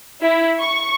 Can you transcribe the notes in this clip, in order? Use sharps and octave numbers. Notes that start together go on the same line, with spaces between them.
E4
C#6